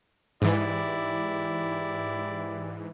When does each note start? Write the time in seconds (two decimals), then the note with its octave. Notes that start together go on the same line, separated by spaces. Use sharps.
0.42 G#2 E3 E4 G4 D5